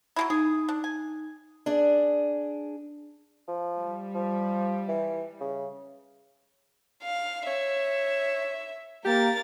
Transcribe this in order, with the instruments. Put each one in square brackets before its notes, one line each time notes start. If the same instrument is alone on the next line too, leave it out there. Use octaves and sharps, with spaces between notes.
[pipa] F#3 G#3 E4
[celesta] D#4 D#6 [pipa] G#4
[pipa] D4
G#5
[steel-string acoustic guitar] D4 G#4 D5
[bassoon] F3
[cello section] G3
[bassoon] F3
E3
C#3
[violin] F5
[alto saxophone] C#5 [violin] E5
[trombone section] A#3 [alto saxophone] G4 [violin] A#4 A6